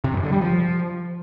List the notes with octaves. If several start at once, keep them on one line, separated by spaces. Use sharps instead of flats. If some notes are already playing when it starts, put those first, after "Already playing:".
C3
F#2
D3
G3
F3